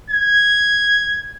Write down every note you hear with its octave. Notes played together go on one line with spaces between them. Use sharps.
G#6